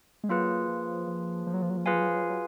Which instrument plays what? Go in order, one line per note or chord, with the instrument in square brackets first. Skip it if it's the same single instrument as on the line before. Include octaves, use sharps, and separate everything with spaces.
[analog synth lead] G#3
[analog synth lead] F#3 [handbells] A#3 F4 G#4 B4
[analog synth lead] F3
F3
F3
F#3
F3
F#3
F3
[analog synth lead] F#3 [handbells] F4 G#4 B4 F5 G#5
[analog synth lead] F3
F#3
F3
F#3
F3
F#3